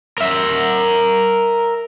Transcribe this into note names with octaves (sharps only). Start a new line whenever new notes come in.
A#4 E5